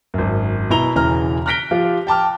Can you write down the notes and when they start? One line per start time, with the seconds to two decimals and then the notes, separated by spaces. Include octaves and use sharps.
0.14 G#1 F#2
0.70 B2 E4 A#5 F7 G7
0.95 E1 C#3 E3 A#5 F6
1.46 F6 F#6 A#6 B6 D7 G7
1.71 F3 F4 G4
2.07 G5 A5 D6 F6